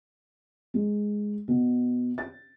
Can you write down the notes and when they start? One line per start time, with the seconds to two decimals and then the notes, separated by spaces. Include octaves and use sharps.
0.74 G#3
1.48 B2
2.18 A6